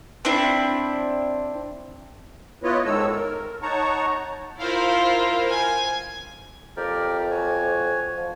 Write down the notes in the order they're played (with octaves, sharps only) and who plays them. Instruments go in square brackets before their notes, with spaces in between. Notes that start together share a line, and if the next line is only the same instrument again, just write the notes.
[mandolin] C4 D4 E4
[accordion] B3 E4 F4 B4 C#5 D#5
G#2 D#3 G#3 A4 C#5 E6
A#4
D#4 C#5 F#5 A5 A#5 C#6
[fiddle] E4 F4 [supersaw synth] A#4 C5 F5
[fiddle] G#5
[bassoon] F2 [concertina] G4 A#4 D5
[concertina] F#4 C#5 G#5
[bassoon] F3